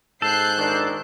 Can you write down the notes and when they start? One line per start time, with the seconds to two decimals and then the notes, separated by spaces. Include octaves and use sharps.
0.22 G#2 A4 F#6 G6 C7
0.57 A#2 D#3 D4